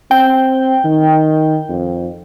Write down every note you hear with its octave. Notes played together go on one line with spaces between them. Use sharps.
C4 G5
D#3
F2